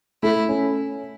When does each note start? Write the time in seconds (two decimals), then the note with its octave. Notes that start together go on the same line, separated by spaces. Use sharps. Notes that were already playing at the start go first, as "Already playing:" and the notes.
0.23 A3 E4
0.49 C#4